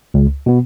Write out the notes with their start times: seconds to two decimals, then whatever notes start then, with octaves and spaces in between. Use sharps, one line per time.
0.14 C#2
0.46 B2 B3